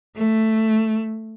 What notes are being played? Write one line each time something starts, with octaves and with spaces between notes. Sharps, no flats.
A3